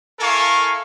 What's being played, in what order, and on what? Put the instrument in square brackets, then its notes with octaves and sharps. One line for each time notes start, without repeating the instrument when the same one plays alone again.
[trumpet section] E4 A4 A#4 F5 G#5 C#6